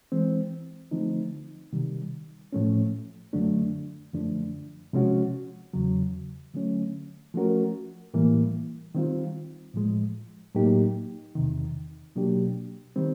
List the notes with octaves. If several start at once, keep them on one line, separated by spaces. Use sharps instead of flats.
E3 G#3 C4
D3 F3 A3 C4 D#4
C3 D#3 G3
A2 F3 A3 C#4
F#2 D3 F#3 A3 D4
F#2 D3 F3 A3 D4
C3 F3 G#3 C#4 F#4
E2 C#3 F#3
D3 F#3 A3 C#4
F3 A3 C#4 F#4 A#4
A2 E3 G3 A#3
D#3 G3 C4 F4
A2 F3 G#3
A2 F#3 A#3 D#4 G4
E2 C3 D#3
B2 F#3 A#3 D4 G4
D#3 G3 C4